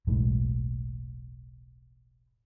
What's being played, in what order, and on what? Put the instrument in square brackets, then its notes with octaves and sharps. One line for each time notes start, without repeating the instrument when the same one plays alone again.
[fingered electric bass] E1 B1 A2 G#3